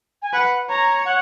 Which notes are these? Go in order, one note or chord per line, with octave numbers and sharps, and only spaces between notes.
G#5
B4 F#5
C#5 A#5
F#5